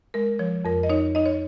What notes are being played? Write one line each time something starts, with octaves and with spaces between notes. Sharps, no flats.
G#3 A#4
F3 C#5
F2 A#4
D#5
D#4 C#5
D#4 D#5
C#5